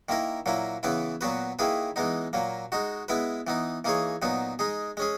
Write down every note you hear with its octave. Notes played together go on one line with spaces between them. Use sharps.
D#3 A#3 E4 A#4
A#2 F#3 A#3 E4
C#3 E3 B3 E4 B4
A#2 F#3 B3 F#4 B4
D#3 A#3 E4 G#4 B4
E3 G#3 B3 D#4
A#2 F#3 A#3
G#3 D#4 F#4
G#3 B3 E4 B4
E3 B3 D#4
E3 A#3 D#4 G#4 C#5
A#2 F#3 B3 D#4
G#3 D#4 G#4
G#3 C#4 G#4